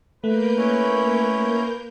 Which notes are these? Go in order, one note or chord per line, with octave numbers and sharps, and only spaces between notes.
A3 A#3 A#4 B4 G6
C#4 E4 C#5